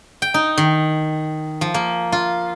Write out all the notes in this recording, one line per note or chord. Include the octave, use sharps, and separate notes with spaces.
G5
D#4
D#3
F3
A#3
F4